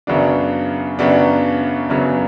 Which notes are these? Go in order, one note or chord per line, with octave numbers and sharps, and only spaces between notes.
F#2 C#3 F#3 B3 D4
F#2 C#3 F#3 B3 D4
F#2 C#3 F#3 B3 C#4